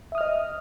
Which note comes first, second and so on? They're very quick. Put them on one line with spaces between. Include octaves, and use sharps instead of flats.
E5 D#6 F6 D#5